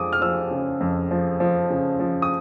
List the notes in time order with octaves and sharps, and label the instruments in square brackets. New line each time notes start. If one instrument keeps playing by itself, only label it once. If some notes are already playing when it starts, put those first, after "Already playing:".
Already playing: [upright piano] F2 F3 G#3 D6 D#6
F6
F3 E6
C#3
F2
F3
F3
C#3
F3
D#6